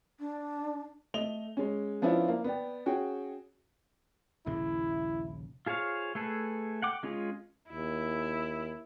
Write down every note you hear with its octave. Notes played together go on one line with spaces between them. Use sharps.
D4
A3 D#5 F7 G7
G#3 C#4
F3 B3 C#4 D4 E4 F4
A#3
B3 D5 G5
C#4 F#4 G#4 G5
A#1 D#2 C#3 E4
F4 G#4 C5 C#5 F5
A3 G#4 A4 B4
F#5 G5 D6
G#3 C#4 F4 G#4
D#2 E4